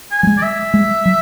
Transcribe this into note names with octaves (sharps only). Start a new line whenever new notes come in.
G#5
F#3
G#3
D5
E5
G#3
F#3